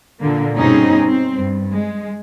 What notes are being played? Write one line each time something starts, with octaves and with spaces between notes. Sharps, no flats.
A#2 D3 A#3
G2 B2 C4 C#4 D#4 G#4
C4
G2
G#3